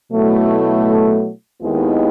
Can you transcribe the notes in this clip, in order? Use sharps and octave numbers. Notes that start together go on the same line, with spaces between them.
B2 F#3 A3 E4
D#2 D#3 G#3 B3 E4